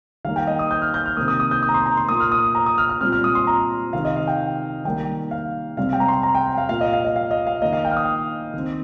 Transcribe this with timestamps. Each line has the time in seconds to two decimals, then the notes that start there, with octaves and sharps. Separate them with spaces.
0.25 D#3 G3 A#3 F5
0.36 G5
0.47 D#5
0.59 D#6
0.71 G6
0.82 F6
0.94 G6
1.06 F6
1.17 C3 D#3 A#3 D#6
1.28 D#6
1.40 D#6
1.51 G6
1.63 D#6
1.69 A#5
1.74 C6
1.86 A#5
1.97 C6
2.09 A#2 A#3 D#6
2.20 F6
2.32 D#6
2.55 A#5
2.66 D#6
2.78 F6
2.89 F6
3.01 A#2 G3 C4 F6
3.12 F6
3.24 D#6
3.35 C6
3.47 A#5
3.93 C3 D#3 C4 F5
4.05 D#5
4.16 F5
4.27 G5
4.85 D#3 G3 A#3 G5
5.31 F5
5.77 C3 G3 C4 F5
5.93 G5
6.00 A#5
6.08 C6
6.23 A#5
6.35 G5
6.58 F5
6.69 A#2 A#3 F5
6.81 D#5
6.93 F5
7.04 D#5
7.16 F5
7.31 D#5
7.47 F5
7.61 D#3 A#3 D#5
7.73 F5
7.85 G5
7.91 F6
7.97 D#6
8.54 D#3 C4